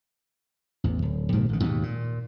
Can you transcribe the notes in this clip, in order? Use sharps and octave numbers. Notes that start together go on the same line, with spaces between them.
A1 E2
D1
A#1 G#2 C3 D#3
A1 D3 D#3
D#2 G#2 B2
A#2